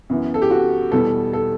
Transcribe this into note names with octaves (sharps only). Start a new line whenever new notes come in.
F#2 E3 B3
A4
G4
F#4
E2 B2 G3 B3 A4
A4